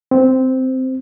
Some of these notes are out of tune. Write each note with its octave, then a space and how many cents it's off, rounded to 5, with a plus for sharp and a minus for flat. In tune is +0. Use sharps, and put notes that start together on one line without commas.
C4 -10